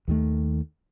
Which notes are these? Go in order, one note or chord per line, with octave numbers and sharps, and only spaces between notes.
D#2 D#3 A3